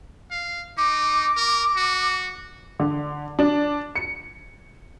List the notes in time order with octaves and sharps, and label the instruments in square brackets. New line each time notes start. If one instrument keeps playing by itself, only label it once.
[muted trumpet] F5
[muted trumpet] D#4 [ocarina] D6
[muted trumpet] A#4
F#4
[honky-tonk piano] D3
D4
C#7